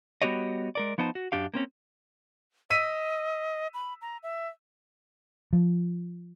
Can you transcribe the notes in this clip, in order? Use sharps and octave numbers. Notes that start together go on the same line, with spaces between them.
G3 B3 F#4 G4 C#5 D#5
G#3 A#4 D5
F3 B3 D#4 C5 A5
F#4
F#2 D4 G4 F5
A#3 C4 C#4
D#5 E6 B6 D#7
B5
A#5
E5
F3